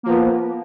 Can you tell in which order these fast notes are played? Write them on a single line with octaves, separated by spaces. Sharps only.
A#3 F3 B3